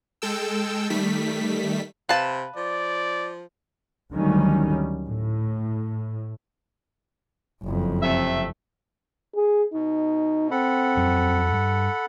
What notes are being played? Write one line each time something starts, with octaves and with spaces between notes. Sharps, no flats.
G#3 A4 G5 E6
D#3 G3 A3 B6
C3 B4 F5 A5
F3 D5
D2 D#3 F#3 G3 C#4
A2
F#1 F2
C3 A3 E5
G#4
B2 D#4
C4 A4 F#5 B5
F2 F#3
G2